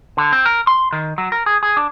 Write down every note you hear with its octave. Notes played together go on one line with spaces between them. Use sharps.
D3
C4
A#4
C6
D#3
F#3
A#4
G#4
G#4
D4